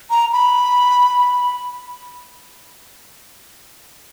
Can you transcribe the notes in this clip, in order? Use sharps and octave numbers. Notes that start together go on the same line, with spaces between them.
A#5
B5